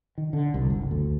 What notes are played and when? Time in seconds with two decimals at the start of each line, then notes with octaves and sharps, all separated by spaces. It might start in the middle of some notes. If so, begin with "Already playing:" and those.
0.18 D#3
0.33 D3
0.54 C2
0.70 F#1
0.91 D2